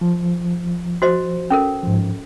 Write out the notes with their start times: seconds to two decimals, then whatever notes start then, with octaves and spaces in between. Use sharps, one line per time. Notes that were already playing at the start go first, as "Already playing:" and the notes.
0.01 F3
1.02 F#4 C5 D#5
1.50 C#4 A4 A#4
1.83 G#2 F3